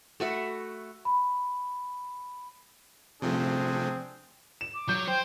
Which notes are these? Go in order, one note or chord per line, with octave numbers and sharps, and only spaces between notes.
A3 F#4 E5 B5
B5
C3 F3 A3 C4 D4 G#4
E7
D6
F#3 G6
C5 G5